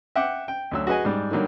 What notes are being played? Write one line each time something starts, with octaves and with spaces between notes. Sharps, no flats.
E5 F#5 G5 D6
G5
D2 F#3 E6
F#4 G#4 B4 D#5 G#5
G#2 G3
D3 D#3 F#3 G3 A#3